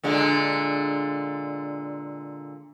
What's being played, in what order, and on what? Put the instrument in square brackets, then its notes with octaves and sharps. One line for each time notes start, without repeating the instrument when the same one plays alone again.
[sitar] A#2 D3 G#3